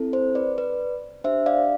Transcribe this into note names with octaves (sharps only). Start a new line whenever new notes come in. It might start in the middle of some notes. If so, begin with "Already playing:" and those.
Already playing: C4 E4 A4
C5
B4 D5
B4 D5
D4 G4 C5 E5
D5 F5